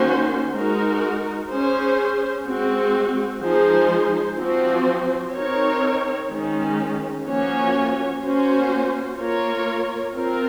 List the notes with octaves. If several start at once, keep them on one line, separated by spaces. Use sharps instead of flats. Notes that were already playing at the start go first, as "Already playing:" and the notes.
Already playing: D#3 A#3 C#4 F#4 C5
G#3 D#4 F#4 A#4
C#4 G#4 C5
G#3 C4 F#4
F3 G#3 D#4 G#4 C5
F3 C4 F#4 C5
C4 D#4 A#4 C#5
D#3 G#3 C#4
F3 A#3 C#4 F#4 C#5
A#3 C#4 F#4 C5
A#3 F4 A#4 C#5
C4 F4 A#4